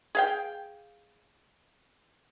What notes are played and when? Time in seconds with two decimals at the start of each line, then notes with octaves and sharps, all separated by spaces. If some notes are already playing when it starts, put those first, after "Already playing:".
0.15 G#4 F5 G5